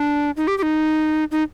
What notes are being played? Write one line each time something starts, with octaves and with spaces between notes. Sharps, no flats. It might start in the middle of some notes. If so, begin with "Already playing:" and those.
Already playing: D4
D#4
G4
G4
D#4
D#4